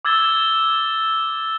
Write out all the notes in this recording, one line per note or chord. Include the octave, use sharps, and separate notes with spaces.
D6 E6 G#6 A6 G7